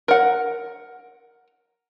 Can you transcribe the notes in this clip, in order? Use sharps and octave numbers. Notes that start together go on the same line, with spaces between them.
A#4 F#5